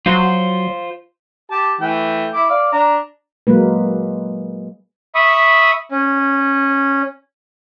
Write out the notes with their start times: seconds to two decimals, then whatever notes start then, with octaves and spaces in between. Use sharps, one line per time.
0.06 F#3 F4 C5
1.51 G4 A5
1.81 E3 A3 G5
2.33 E4 D6
2.50 D5 F5
2.72 D4 A#5
3.47 F#3 G#3 A#3 B4
5.15 E5 B5 C#6 D#6
5.91 C#4